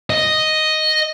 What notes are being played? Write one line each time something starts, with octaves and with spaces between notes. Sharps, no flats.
D#5